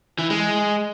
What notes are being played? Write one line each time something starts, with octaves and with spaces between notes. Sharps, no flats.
E3
G#3